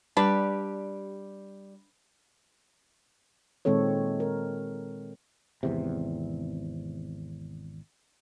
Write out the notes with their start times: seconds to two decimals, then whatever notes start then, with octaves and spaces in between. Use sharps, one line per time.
0.17 G3 D4 G4 B4
3.65 A#2 D#3 G#3 C4 A4 C#5
4.20 A#4
5.63 G#1 E2 C3